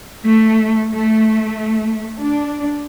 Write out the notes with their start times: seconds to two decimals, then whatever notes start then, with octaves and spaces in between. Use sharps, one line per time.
0.24 A3
0.90 A3
2.22 D4